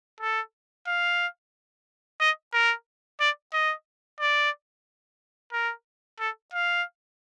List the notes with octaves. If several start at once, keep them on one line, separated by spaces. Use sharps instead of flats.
A4
F5
D#5
A#4
D5
D#5
D5
A#4
A4
F5